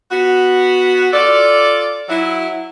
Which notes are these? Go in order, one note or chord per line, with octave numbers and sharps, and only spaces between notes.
B3 F#4
F4 A4 D5
F#3 E4